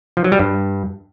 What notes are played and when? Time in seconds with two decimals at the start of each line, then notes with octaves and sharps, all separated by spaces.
0.17 F3
0.24 F#3
0.32 G3
0.39 G2